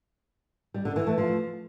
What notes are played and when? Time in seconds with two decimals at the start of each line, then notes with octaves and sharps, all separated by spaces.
0.74 G3
0.85 D3
0.96 E3
1.07 A3
1.18 F3